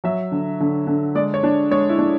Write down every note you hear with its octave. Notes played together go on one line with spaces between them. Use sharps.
F#3 E5
D3
D3
D3
G#3 D5
C#5
D4
G#3 C#5
E4
D4